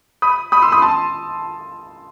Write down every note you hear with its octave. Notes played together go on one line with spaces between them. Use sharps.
B5 D#6
B5 D#6
C6 E6
B5 D#6
A5 C6